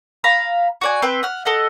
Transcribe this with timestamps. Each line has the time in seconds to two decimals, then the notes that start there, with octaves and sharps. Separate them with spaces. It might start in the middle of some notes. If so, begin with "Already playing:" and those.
0.24 F5 A#5 B5
0.81 F#4 D5 G#5
1.02 C4 B4 G5
1.23 F#5 F6
1.45 A4 D#5 F#5